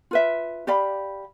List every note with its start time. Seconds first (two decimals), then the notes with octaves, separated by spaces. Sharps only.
0.11 F4 B4 E5
0.67 G4 D5 F5 B5